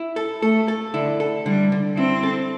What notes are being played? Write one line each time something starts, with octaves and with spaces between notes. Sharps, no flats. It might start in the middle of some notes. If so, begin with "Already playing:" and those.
Already playing: E4
A4
A3 A4
A4
D3 E4
A4
D3 G3
D3
C4 E4
A4